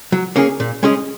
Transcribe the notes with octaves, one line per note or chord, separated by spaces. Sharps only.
F#3
A#3 C#4 G#4
A#2
G#3 C#4 G#4 D#5